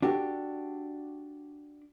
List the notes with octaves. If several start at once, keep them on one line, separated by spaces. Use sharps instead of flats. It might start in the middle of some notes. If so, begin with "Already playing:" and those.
D4 F#4 G4 A4